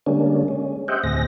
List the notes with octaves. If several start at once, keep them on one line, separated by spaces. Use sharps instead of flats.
D3 G3 G#3 A#3 C#4 D4
G#3 C#4
G4 C5 D#5 E5 F#5 G5
D2 A2 C4 G#4 A#6